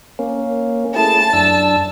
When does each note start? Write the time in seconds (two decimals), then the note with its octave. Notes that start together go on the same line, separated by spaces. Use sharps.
0.19 A#3 C#4
0.96 A3 E4 G#4 A5
1.33 F#2 D4 E6